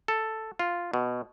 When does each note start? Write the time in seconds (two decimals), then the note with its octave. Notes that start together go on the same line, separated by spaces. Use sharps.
0.08 A4
0.59 F4
0.94 B2